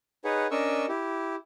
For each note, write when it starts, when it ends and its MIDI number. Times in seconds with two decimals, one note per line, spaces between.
0.24 0.47 63
0.24 0.47 68
0.24 0.47 71
0.24 0.47 73
0.24 0.47 78
0.51 0.86 61
0.51 0.86 62
0.51 0.86 70
0.51 0.86 75
0.51 0.86 85
0.51 0.86 88
0.88 1.35 64
0.88 1.35 67